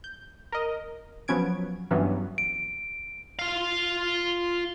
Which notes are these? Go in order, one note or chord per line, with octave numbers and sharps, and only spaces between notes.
G6
A#4 D#5
F3 F#3 B3 C#4 G#6 D7
G2 E3 F#3 B3 C#4
D7
F4 F5